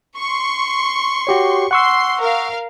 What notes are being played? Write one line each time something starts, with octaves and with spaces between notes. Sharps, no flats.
C6 C#6
F#4 G4 C#5
F#5 C6 C#6 E6
A#4 F5